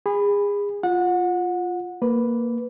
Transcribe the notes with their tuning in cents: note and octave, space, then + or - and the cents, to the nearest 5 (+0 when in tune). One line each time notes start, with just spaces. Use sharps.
G#4 -30 B5 +5
F4 +0 F#5 -25
A#3 -5 B4 +0